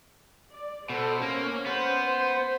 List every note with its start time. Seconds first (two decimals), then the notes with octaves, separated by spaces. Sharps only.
0.52 D5
0.90 B2 A4 C5
1.21 A#3 C#4
1.66 B3 C5